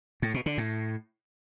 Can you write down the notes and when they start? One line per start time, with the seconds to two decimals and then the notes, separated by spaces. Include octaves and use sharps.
0.22 A2
0.34 B2
0.46 D3
0.58 A2